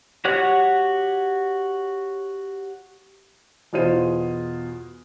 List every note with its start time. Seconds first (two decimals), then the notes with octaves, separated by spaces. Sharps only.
0.25 F#4 G4 C#5 F#5 F#6
3.73 E2 B2 F4 G#4 C5 D#7